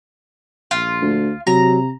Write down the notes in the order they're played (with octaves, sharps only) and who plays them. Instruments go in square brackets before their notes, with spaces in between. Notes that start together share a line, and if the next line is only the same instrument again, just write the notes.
[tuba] A#1 [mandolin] F4
[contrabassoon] D2
[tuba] C3 [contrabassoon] F#3 [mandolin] A#5